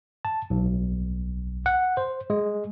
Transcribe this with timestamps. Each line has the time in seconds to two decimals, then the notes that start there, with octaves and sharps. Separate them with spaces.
0.25 A5
0.50 B1
1.66 F#5
1.97 C5
2.30 G#3